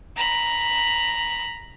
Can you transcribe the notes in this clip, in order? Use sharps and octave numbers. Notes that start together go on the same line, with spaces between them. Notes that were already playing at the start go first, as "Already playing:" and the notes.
A#5 B5